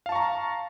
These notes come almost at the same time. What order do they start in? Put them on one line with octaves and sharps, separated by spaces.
F5 A5 C#6 A#5